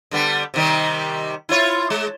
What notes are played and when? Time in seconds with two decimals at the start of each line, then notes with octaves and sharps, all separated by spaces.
0.11 D3 G3 B3
0.54 C3 D#3 G3
1.49 E4 F4 C#5
1.90 G#3